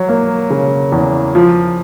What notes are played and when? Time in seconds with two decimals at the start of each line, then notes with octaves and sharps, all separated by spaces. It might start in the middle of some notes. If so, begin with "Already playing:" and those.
Already playing: F#3
0.09 A#3
0.50 C#3
0.92 E2
1.35 F3